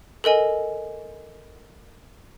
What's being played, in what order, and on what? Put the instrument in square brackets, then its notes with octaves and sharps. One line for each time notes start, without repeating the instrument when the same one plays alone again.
[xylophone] A4 A#4 D#5 G#5